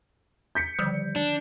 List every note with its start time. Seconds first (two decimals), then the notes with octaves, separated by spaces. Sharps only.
0.55 G6 B6 C#7
0.79 D3 D#3 F3 G3
1.16 D4